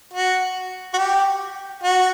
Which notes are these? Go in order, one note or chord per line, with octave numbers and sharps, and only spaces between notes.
F#4
F#4
G4
F#4